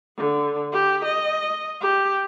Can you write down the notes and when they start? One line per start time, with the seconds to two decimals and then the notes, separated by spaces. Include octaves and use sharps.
0.17 D3
0.73 G4
1.05 D#5
1.81 G4